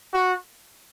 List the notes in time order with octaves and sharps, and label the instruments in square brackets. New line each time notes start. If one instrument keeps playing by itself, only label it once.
[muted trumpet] F#4